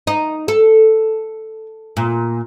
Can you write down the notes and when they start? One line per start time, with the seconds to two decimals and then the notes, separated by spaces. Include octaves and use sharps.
0.07 D#4
0.48 A4
1.97 A#2